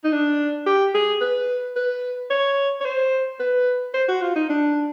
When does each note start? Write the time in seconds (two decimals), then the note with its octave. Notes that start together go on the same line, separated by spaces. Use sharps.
0.04 D#4
0.13 D4
0.66 G4
0.95 G#4
1.21 B4
1.76 B4
2.30 C#5
2.81 C#5
2.85 C5
3.40 B4
3.94 C5
4.09 F#4
4.22 F4
4.36 D#4
4.49 D4